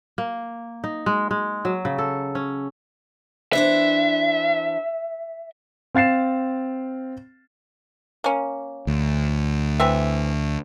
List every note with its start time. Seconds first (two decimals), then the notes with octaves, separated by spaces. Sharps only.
0.18 A#3
0.84 D#4
1.06 G#3
1.31 G#3
1.65 F#3
1.85 C#3
1.98 A4
2.35 C#4
3.53 E3 D4 C5 E5
5.95 C4 F5 A6 C7 E7
8.24 A#3 C#4
8.87 D2
9.79 E3 C4 E5